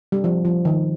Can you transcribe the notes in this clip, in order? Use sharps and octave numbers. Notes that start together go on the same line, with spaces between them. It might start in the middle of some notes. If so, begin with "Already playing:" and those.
G3
F3
F3
D#3